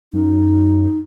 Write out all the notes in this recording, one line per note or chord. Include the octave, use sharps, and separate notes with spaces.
F#2 D#4